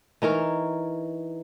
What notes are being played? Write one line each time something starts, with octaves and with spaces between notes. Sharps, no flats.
E3 D#4 A#4 C#5